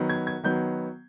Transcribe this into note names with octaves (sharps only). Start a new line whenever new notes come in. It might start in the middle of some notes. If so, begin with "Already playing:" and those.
Already playing: D#3 F#3 B3
G#6
G#6
D#3 F#3 B3 G6